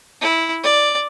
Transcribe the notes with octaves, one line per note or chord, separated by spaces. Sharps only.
E4
D5